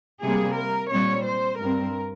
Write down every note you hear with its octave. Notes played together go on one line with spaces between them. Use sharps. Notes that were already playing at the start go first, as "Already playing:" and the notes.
C3 G3 A#3 G#4
A#4
A#2 G3 C4 C#5
C5
G2 G3 C4 A#4